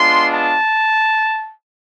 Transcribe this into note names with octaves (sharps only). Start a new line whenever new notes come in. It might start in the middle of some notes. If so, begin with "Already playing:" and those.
Already playing: G#3 B3 D4 F4 C6
A5